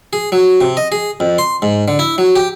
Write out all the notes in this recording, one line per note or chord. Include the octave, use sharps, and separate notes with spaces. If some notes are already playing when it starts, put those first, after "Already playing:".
G#4
F#3
C3
D#5
G#4
F2
C6
G#2
D3
E4
F#3
G4